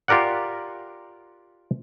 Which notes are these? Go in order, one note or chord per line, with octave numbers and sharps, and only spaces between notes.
F4 G4 A#4 D5 F#5